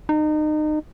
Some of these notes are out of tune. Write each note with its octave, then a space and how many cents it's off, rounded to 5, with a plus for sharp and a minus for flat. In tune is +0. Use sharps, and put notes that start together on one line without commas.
D#4 -30